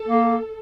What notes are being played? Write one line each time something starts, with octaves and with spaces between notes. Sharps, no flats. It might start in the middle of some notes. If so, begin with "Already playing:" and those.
Already playing: A4
A#3